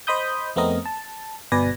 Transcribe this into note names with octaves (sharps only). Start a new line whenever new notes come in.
C5 D#5 B5 D#6 G6
F2 A3 B3 C4 A#4 D#5
A5
G1 B2 B4 D5 G#5 A#6